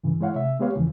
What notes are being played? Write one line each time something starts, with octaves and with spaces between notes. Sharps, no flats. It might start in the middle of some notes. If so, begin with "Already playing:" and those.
G2 C#3 E3
G#3 E4 C#5 F5 F#5
C3 E5
G#3 B3 G4 B4 C#5 F5
D#2 C#3 E3 F3